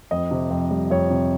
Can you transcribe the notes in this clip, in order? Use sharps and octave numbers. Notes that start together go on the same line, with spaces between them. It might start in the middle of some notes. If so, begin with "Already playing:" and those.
F2 D#5
C3
F2
G3
F2 C#5
C3